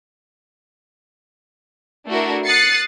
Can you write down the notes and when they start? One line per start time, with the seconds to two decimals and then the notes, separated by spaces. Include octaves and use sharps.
2.08 A3 D4 E4 F#4 A#4
2.46 D#6 F#6 A6 C7 C#7